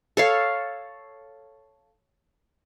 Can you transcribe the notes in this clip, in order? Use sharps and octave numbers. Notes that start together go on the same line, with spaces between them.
A4 C#5 F5